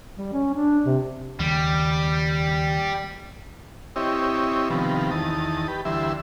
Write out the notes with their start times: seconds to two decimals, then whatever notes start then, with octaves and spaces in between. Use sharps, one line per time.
0.18 G3
0.33 C#4
0.54 D4
0.86 C3
1.40 D#2 C#3 G3
3.96 C4 E4 G4 C#5 D#5
4.70 C3 D#3 F3 G3 B3
5.11 E2 D#3 A5 D#6
5.68 G4 B4
5.85 D2 E3 G3 E5 C6